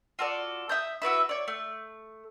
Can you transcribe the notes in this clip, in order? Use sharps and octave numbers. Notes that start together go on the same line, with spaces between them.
F4 F#4 A4 D5
E5 D#6 G6
E4 F#4 B4 E5
C#5 D5
A3